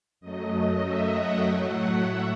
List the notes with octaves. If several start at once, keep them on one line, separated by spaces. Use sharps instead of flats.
F#2 F#3 A3 D#5
E5
F#5
A2 F#3 A3 G5
F#5
E5